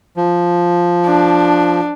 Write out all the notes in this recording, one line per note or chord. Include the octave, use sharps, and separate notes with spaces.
F3
D4